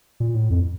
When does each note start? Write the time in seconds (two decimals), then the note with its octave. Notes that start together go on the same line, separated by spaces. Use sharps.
0.20 A#2
0.35 A2
0.50 F2